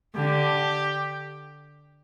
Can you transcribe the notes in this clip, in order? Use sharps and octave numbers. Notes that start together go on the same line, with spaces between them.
D3 G4